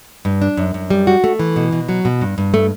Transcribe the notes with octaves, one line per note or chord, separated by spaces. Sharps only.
G2
D4
F#2
F#2
G3
F#4
A3
E3
B2
B2
F#3
B2
G2
G2
A3